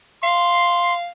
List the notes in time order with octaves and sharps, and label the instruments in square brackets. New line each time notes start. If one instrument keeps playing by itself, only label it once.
[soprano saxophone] F5 [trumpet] C6